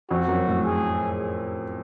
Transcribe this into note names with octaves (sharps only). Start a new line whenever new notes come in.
F2 F#4
F#2
A2
G#4